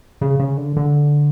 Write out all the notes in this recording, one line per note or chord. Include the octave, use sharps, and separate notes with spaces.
C#3
C#3
D3
D3